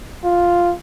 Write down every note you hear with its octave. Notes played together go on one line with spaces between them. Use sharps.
F4